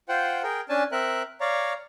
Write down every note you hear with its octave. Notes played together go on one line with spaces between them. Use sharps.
F4 C5 F#5 G5
G#4 A#4 G5
C#4 D4 G#5 A5
C4 A#4 E5 F#6
C#5 D5 F5 A#5